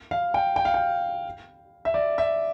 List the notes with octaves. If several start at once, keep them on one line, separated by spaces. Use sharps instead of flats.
F5
G5
G5
F5
G5
E5
D5
E5